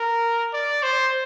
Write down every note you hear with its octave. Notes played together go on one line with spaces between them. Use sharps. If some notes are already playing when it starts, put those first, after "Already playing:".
Already playing: A#4
D5
C5